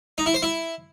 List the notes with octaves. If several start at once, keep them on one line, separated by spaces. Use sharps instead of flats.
D#4
E4
C5
E4